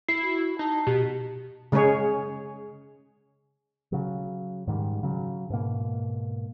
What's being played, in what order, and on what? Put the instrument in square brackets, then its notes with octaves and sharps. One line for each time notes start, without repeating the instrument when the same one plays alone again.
[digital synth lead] E4 [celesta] C7
[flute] F#4
[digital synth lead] D#4 [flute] A5
[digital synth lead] B2 [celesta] G4
[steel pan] C#3 G#3 C#4 G#4 C#5
[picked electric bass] C#3 F#3
G#2 D#3 F3 G3
C#3 F#3
G#2 B2 A#3